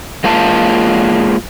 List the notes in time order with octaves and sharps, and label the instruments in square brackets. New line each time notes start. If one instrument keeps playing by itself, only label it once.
[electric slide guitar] G#3 A#3 F4 A5